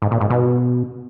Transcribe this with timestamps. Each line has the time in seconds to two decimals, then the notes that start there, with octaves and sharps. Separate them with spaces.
0.02 G#2
0.11 A#2
0.21 G#2
0.30 B2